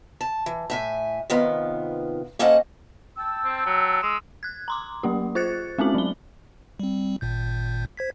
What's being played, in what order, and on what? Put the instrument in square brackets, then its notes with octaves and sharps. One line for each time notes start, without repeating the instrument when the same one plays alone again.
[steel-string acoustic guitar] A5
E3
A2 E5 G#5
C3 D#3 B3 F4
A#3 C#4 A4 C5 D#5 F#5
[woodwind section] G5 A5 E6
[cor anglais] C4
F#3
[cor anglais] G#3 [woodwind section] E6
[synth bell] F#6 G#6
A#5 C6 D6
F#3 A#3 G4
F4 C5 F#6 A6 C#7
G#3 C4 C#4 F#4 F#7
F#3 G7
[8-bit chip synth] G3 C4
G#1 A#2 G6
C5 G#6 B6